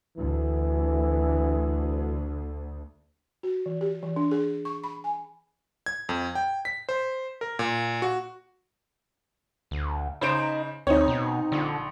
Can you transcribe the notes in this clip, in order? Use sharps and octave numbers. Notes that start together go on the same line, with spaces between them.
D2 E3
F#4
E3
G4
E3
D4
G#4
C#6
B5
G#5
G#6
F2
G5
B6
C5
A#4
A#2
F#4
D2
C#3 D#4 C5 D7
D2 C4 D#4 C#5
B2
A#1 D3